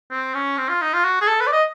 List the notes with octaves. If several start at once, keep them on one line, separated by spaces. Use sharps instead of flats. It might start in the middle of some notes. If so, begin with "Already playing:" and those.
C4
C#4
C4
F4
D#4
F4
F#4
G#4
A4
B4
D5
D#5